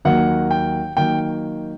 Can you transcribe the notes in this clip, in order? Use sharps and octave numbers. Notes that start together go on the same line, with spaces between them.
D#2 D#3 F#3 A#3 F#5
G5
D#3 F#3 A#3 G5